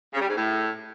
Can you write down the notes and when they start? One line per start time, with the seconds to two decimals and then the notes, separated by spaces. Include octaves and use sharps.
0.13 C#3
0.21 G3
0.29 G#2
0.37 A2